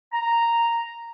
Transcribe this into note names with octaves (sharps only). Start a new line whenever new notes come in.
A#5